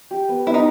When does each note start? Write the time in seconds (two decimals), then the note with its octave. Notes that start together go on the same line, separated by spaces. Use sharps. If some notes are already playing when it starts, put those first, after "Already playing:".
0.11 G4
0.29 B3
0.47 B3 E4
0.54 D#4